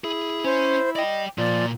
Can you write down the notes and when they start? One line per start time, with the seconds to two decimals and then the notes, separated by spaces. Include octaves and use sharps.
0.04 E4 G#4
0.44 C#4 C5
0.96 D5 D#5 G5
1.38 A#2 F3 D5